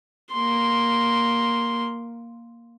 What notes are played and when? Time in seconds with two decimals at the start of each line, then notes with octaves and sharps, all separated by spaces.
0.32 A#3 C6